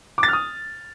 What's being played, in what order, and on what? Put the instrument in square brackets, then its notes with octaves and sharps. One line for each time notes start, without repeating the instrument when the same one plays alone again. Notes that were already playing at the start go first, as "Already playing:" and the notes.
[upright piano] D6
A6
F6
D#6